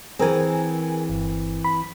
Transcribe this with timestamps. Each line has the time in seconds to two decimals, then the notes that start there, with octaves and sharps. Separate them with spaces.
0.19 E3 C4 G#4 A#4 G#5
1.09 G1
1.64 B5